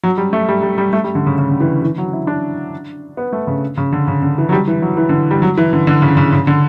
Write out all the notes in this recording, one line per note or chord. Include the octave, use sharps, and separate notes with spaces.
F#3
G3
A3
G3
G3
G3
A3
G3
D3
C#3
C#3
D3
E3
E3
F#3
E4
D4
B3
A3
C#3
C#3
D3
C#3
D3
E3
F#3
G3
E3
F#3
E3
D3
G3
F#3
E3
D3
D3
C#3
C#3
C#3
D3